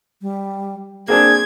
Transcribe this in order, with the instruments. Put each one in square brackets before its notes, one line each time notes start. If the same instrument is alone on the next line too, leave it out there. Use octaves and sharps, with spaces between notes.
[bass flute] G3
[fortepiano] A#3 C4 D4 [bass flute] G#4 [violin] G#6